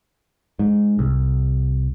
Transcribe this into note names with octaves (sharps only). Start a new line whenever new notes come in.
G#2
C2